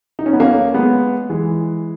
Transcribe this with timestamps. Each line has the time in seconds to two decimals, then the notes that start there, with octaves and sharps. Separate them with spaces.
0.19 D#4
0.26 C#4
0.33 B3
0.40 A#3 C#4
0.74 G#3 B3
1.30 E3 G#3